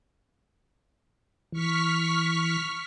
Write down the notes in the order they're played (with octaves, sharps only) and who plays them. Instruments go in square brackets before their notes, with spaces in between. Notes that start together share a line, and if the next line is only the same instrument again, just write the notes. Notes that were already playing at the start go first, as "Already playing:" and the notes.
[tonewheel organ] E3 [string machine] C#6 F6 B6